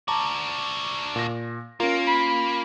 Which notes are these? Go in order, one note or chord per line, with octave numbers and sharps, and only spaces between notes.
D4 F#4 A5 A#5 D6
A#2 A#6
A#3 C#4 F4 A#4
B5